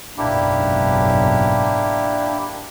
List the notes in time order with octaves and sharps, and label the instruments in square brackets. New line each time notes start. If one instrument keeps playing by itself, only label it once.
[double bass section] F#1 B1 G#2 [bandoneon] A#3 E4 G4 [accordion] D4